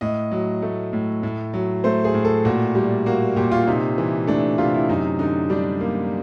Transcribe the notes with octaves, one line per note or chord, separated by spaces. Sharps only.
A2 D#5
F#3
A3
A2
A2
F#3
A3 C5
G#4
A2
A4
A#2 F#4
G3
A#3 F#4
A#2 G4
F4
C3 D#4
E3
A3 D4
C3 F4
E4
F#2 D#4
D3 D#4
G3 D4
A#3